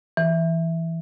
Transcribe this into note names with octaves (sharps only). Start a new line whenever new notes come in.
E3